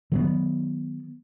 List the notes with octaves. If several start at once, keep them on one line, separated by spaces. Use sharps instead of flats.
D#3 F#3 B3